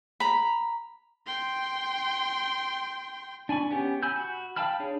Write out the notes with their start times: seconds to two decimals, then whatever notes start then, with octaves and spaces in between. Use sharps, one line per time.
0.20 A#5 B5
1.27 G5 C6
3.49 D4 G#5 B5 C#6
3.71 B3 C#4 G4
4.03 G#5 B5 E6 G6
4.16 F#4 B5
4.56 F5 G5 A5 B5 F6
4.80 D4 G#4 C#5